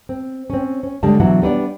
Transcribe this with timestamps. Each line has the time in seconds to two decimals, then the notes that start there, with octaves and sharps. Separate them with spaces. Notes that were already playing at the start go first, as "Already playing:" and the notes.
0.09 C4
0.50 C4 C#4
0.83 C#4
1.03 D3 G3 G#3 A5
1.20 B2 E3 F#3 D4 E4 F#5
1.42 G3 B3 D4 D5